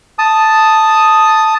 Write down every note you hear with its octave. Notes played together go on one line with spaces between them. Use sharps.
A5 D#6